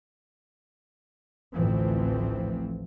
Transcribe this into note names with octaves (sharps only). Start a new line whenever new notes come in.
A1 D2 A2 E3 F3 C4